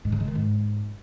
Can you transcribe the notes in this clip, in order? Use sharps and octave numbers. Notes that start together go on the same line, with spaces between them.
G#2
C#3
G#3
D#3
G#2